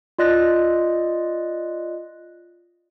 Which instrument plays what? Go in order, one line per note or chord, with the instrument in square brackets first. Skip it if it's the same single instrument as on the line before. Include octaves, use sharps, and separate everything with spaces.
[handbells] F4 D5 D#5 F#6 A#6